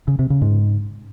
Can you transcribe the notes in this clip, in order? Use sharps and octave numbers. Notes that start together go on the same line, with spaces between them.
C#3
C3
C#3
G#2